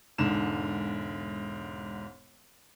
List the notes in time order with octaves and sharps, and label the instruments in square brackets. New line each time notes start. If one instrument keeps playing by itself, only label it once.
[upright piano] E1 G#2 D3 E7